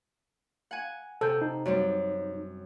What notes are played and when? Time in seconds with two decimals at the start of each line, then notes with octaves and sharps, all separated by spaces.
0.71 F#5 G#5
1.21 C3 A4 G6
1.42 D#4
1.66 F#2 G3 C4